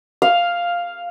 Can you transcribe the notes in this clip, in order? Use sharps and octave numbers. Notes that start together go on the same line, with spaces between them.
F5